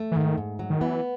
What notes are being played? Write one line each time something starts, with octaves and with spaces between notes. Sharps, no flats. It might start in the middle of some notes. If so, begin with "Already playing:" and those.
Already playing: A3
E3
G#2 D#3
G#2
F#3
D#3
E3 B3